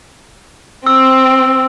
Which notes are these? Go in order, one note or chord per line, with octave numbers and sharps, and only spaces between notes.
C4 E6